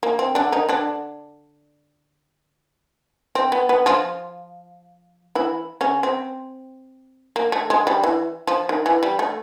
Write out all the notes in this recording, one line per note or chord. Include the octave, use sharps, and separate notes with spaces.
A#3
C4
D3 D4
D#3 D#4
D3 D4
C4
B3
B3
F3 F4
E3 E4
C#3 C#4
C4
A#3
A3
G#3
G3
E3
F3
D#3
E3
G3
A3